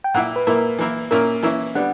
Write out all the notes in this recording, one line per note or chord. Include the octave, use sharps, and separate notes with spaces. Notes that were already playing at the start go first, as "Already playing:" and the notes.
G5
A#2 A#3 E4 F#5
B4
A#2 A#3 E4 A#4
E3 A#3 E4
A#2 A#3 C#4 E4 A#4
E3 A#3 C#4 E4
D3 G3 B3 D4 F#5